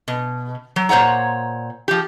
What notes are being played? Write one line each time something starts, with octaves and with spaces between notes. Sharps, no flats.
B2
F#3
A#2 C5 C#5 F#5 A#5
F3 G4